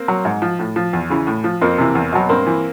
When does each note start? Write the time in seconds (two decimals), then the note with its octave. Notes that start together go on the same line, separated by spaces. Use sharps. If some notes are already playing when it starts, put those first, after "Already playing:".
Already playing: A#3 C4
0.08 F#3
0.25 G#2
0.42 F3
0.59 A2
0.76 F3
0.93 E2
1.10 C#3 E3
1.27 A2
1.44 F3
1.61 F2 A#3 C4
1.78 C3 E3
1.95 E2
2.12 B2 F#3
2.29 G2 A#3 C4
2.46 E3